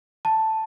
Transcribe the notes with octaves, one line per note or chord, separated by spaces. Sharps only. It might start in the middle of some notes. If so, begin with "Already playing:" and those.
A5